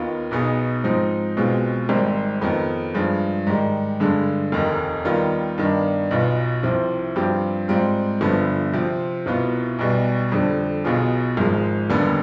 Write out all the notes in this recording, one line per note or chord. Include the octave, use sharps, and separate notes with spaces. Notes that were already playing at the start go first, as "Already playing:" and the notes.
Already playing: D#2 D#3 B3 F4
B1 B2 B3 D#4 G#4
G#2 F3 C4 D#4
B1 B2 G#3 C4 F4
G#1 G#2 G3 C4
F2 D#3 B3
G2 F3 G#3
G#2 D#3 G3
G2 D3 G#3
F1 D#2 D#3
D#2 D#3 G3 B3 F4
G2 D#3 B3 D4
B1 B2 B3 F4
C2 C3 F3 C4
G2 F3 C4 G4
G#2 G3 C4 F4
G1 G2 D3 F3 B3
C3 F3 C4
C2 B2 B3 F4
B1 B2 G3
F2 D3 G3
B1 B2 B3 F4 G#4
G#1 G#2 F3 G#3
F1 D#2 D3 G3 B3